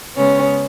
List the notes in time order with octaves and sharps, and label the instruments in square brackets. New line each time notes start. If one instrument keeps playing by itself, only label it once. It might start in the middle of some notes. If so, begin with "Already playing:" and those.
[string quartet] C#3 G#3 B3 C#4